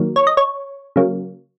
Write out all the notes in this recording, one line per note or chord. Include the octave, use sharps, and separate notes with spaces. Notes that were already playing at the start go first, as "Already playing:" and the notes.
Already playing: D#3 F#3 A#3
C#5
D#5
C#5
C#3 F#3 A#3